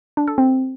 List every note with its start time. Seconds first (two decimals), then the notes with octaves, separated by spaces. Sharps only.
0.17 D4
0.28 A4
0.38 C4